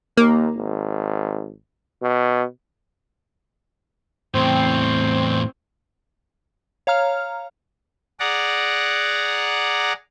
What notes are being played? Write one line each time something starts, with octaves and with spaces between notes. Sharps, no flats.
D#2 A#3
G#1
B2
E2 A2 C4
C#5 F5 A#5 F6
G#4 D5 F#5 A#5